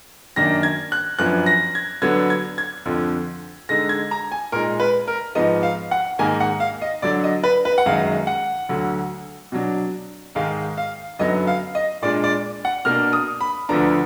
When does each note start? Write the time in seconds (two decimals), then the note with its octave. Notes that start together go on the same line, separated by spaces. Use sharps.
0.36 F#2 D#3 A#3 D4 A#6
0.63 G#6
0.92 F#6
1.19 F#2 F3 B3 D4 F#6
1.46 A#6
1.75 G#6
2.02 D3 F#3 B3 D4 G#6
2.30 G#6
2.58 G#6
2.86 F2 D3 F3
3.69 D3 G#3 D#4 A#6
3.89 G#6
4.11 A#5
4.32 G#5
4.52 A#2 G#3 D#4 A#4
4.80 B4
5.08 A#4
5.35 G#2 F3 B3 D#4 D#5
5.63 F5
5.91 F#5
6.19 G#2 D#3 A#3 G#5
6.40 F#5
6.60 F5
6.82 D#5
7.02 D3 F#3 D4 D5
7.24 D#5
7.44 B4
7.65 B4
7.78 F#5
7.86 F#2 D#3 G#3 D#4 F5
8.27 F#5
8.69 D2 D3 F#3
9.52 B2 F#3 D4
10.35 G#2 D#3 G#3 D#4 F5
10.77 F5
11.19 F#2 D3 F#3 B3 D#4 D#5
11.47 F5
11.75 D#5
12.02 A#2 G#3 D4 D5
12.24 D5
12.65 F#5
12.85 B2 A#3 D4 F6
13.13 D#6
13.41 B5
13.69 D2 D3 F3 B3 D4 A#5